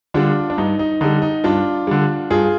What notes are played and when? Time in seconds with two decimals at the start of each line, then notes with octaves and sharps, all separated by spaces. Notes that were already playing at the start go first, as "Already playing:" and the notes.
0.14 D3 G3 D4 F4
0.50 D4
0.58 G2 D#4
0.79 D#4
1.01 D3 G3 D#4
1.22 D#4
1.44 G2 D4 F4
1.87 D3 G3
2.30 G2 F4 G#4